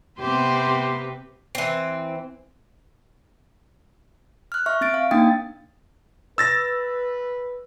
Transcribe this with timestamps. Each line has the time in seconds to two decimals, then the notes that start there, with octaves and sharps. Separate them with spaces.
0.20 C3 B3 C4 G4 B4 C5
1.55 E3 C4
4.52 F6 F#6
4.66 E5 C#6 F6
4.81 C4 A6 D7
4.94 F5
5.11 A#3 D4 D#4 G5 D#6 A6
6.38 B4 E6 A6 A#6